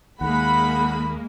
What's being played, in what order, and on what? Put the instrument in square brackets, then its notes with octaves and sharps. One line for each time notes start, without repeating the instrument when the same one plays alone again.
[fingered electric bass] D#2 [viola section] G#3 A#3 [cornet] F#5 [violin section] B5